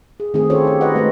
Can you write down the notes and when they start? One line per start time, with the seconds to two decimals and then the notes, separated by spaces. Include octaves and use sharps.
0.20 G#4
0.34 D#3 A3 C4 G#4
0.50 C#4 F4 G4 A4 C5 C#5
0.65 D#4 G4
0.81 F#4 B4 D#5 F#5
0.95 G#3 A3 D#4 B4 C5